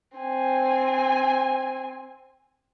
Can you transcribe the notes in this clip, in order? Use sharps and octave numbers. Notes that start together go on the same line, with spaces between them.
C4 G#5